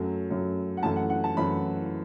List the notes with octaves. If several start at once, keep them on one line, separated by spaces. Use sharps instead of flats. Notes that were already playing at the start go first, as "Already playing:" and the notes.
Already playing: F#2 F#3 A3
F#2 F#3 A3
F#5
F#2 E3 A3 A5
F#5
F#5
A5
F#2 E3 A3 B5